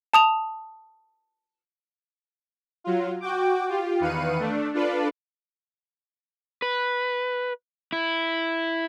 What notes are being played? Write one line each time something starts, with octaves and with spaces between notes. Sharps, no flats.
A5 D#6 F7
F#3 F4
F#4 G5 D6
F4 G4
E2 D#3 B4 F5 C#7 D#7
A3 D4
D4 F4 A4 B4 D5
B4
E4